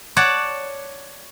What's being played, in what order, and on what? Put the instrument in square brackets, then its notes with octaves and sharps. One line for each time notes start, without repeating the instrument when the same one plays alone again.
[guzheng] C#5 D5 F#5 A5